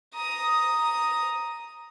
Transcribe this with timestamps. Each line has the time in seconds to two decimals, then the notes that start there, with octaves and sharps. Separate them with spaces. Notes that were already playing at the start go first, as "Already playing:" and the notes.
0.14 A#5 D#6